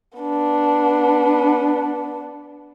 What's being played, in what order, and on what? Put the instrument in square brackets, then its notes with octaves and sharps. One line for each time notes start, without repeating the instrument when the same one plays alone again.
[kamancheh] B3 D4